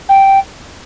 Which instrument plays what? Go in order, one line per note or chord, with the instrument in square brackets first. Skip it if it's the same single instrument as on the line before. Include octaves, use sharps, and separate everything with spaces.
[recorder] G5